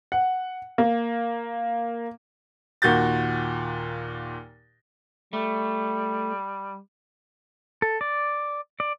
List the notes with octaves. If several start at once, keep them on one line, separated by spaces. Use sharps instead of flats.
F#5
A#3
D#2 A#2 F#4 G6 A6
G3 A3
A4
D5
D5